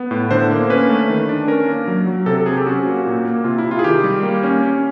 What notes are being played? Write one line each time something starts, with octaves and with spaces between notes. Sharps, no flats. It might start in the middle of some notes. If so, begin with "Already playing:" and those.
Already playing: B3
A2
D3 C5
A#3
C#4 B4
A3
D#3
D4
C#4 A#4
A#3
F#3
F#3
C3 A4
A4
C4 G#4
G4
C#4 F#4
A#3
A#2
A#3
C3 F4
E4
C3
F4
G#4
D#3 G4
G3
A#3
C#4
C#4